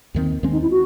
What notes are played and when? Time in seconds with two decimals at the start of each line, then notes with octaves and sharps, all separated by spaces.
0.14 D#2 D#3 G#3 C4
0.43 D#2 D#3 G#3 C4 C#4
0.52 D#4
0.62 E4
0.71 F#4